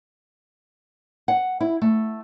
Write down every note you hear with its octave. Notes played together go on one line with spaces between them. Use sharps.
F#5
E4
A3